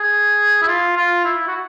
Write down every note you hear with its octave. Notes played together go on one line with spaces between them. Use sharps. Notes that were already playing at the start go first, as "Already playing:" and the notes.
Already playing: G#4
E4
F4
F4
E4
F#4